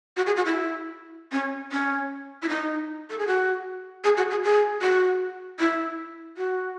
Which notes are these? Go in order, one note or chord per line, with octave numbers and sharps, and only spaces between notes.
F#4
G#4
F#4
E4
C#4
C#4
E4
D#4
A4
G#4
F#4
G#4
F#4
G#4
G#4
F#4
E4
F#4